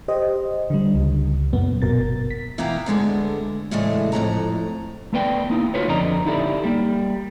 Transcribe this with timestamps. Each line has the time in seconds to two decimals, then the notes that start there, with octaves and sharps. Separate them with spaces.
0.08 G4 C5 D#5
0.70 D3 G3
0.95 C#2
1.53 F#2 A#2 B3
1.82 G1 B2 A#4 A6
2.31 B6
2.58 E3 B3 E4 F5 G5 A#5
2.86 D2 D3 G#3 B3
3.71 A2 C#3 E3 G#3 A3 D4
4.12 F2 A2 C#3 A#5
5.13 A3 B3 B4 D5 G5
5.50 A#3 D#4 E4
5.74 F4 F#4 B4 C#5
5.87 F2 D3 D5 D#5 A#5
6.26 D#4 E4 G4 A4 B4 D5
6.64 G3 A#3